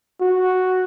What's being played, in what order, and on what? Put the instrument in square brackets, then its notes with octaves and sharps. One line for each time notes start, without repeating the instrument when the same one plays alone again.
[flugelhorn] F#4